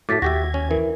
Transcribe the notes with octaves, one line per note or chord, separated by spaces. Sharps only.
A2 A3 F#4 D6 A6 B6
D#2 F#4 G4 E5 G#6 A#6
C#4
E3 A#4